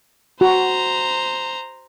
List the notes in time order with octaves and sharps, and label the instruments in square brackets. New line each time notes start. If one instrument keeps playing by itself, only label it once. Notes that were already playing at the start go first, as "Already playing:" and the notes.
[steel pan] F#4 [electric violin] C5 A#5